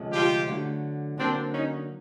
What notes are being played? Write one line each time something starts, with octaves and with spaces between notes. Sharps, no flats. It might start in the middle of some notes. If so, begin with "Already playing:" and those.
Already playing: D2 C3 F3 G#3 C#4
F4 G4
D3 F#3 A3
D3 F#3 A#3 C4 D4
C#4 D#4